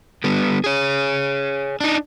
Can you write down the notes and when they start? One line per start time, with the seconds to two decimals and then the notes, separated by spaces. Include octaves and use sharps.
0.24 D3 G3 B3
0.64 G#4 C#5
1.81 D4 D#4